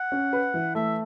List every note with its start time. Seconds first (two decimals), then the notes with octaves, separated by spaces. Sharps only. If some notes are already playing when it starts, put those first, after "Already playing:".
Already playing: F#5
0.12 C#4
0.33 B4
0.54 E3
0.75 A3 E5